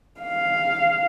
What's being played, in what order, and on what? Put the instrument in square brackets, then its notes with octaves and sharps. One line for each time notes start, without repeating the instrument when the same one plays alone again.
[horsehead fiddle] F5